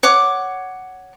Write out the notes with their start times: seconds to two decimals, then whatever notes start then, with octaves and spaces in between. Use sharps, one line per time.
0.03 C#5 F#5 D6